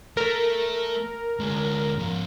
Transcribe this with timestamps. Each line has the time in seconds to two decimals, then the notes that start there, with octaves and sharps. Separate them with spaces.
0.17 A3 A#4
1.40 D2 G#3
1.99 G#2 F3